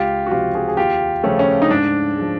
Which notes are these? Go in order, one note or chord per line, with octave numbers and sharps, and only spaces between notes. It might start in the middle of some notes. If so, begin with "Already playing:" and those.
Already playing: C#2 F4 G4
F#4
C3 F3 F4 G4
F#4 G#4
G#4
D#2 F4 G4
C#3 F3 A3 C#4
C#4
D#4
G#2 D4
G#3
F3